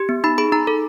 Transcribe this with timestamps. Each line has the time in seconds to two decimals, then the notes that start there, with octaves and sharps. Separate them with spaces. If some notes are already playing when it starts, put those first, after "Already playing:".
Already playing: G4
0.09 B3
0.24 D#4 B5
0.38 G#4 B5
0.52 D#4 A#5
0.67 A4